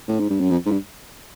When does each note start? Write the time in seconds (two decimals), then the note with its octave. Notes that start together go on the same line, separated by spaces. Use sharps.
0.08 A2
0.20 G#2
0.30 G2
0.40 F#2
0.50 F2
0.66 G#2
0.71 G2